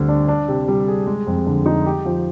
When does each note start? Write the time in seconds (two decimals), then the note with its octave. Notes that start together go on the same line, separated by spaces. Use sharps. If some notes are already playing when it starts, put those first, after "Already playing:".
Already playing: D2 D3 G3 C4
0.09 D4
0.28 D4
0.48 C3
0.68 G3
0.88 G#4
1.07 G#3
1.27 F2
1.47 D3
1.66 D#4
1.86 G4
2.05 F3